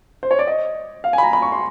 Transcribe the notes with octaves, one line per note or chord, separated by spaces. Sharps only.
C5
C#5
D5
D#5
F5
G#5
B5
A#5
B5
C#6
C6